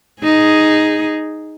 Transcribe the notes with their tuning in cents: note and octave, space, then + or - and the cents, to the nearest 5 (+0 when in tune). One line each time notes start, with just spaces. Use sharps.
D#4 +0 G#4 +0